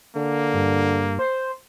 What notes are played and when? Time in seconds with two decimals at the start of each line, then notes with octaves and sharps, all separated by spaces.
0.15 D3 A#3
0.53 G2
1.19 C5